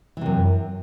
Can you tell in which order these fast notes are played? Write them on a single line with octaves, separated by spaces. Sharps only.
E3 C3 F#2